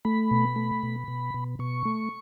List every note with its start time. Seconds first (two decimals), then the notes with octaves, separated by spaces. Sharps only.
0.05 A3 B5
0.31 B2
0.56 A3
0.83 B2
1.08 B2
1.34 B2
1.59 B2 C#6
1.85 A3